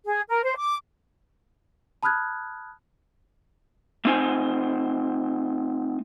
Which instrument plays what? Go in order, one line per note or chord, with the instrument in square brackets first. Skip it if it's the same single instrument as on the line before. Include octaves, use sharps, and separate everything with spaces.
[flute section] G#4
A#4
C5
D6
[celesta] A5 B5 D#6 F6 F#6 G#6
[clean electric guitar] A3 C4 D#4 C5 G#5